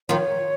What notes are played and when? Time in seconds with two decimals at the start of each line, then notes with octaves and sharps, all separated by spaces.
0.09 D#3 F3 C#5